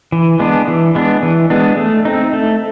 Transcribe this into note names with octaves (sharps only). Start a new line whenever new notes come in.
E3
G#3 B3 D4
E3
G#3 B3 D4
E3
G#3 B3 D4
A3
C4 D#4
A3